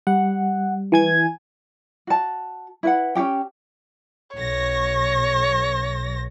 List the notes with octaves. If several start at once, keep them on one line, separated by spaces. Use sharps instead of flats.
G3 F#5
E3 G#5 G#6
F#4 A5
E4 B4 F#5
C#4 D#4 G4 G5
B1 C#5 A#6